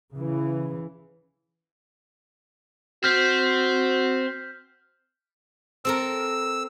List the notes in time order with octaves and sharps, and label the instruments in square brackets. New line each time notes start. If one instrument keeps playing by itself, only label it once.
[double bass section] C#3 E3
[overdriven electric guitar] C4 [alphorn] F#4 [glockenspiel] F6 G6 B6
[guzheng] C4 A4 A#4 [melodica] E6